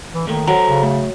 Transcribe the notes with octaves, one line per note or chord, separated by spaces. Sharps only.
E3
A#2 D#3 A3
F#3 A4 C5 A#5
C#3
A3